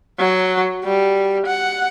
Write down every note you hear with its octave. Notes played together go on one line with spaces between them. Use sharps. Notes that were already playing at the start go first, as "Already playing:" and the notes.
F#3
G3
F#5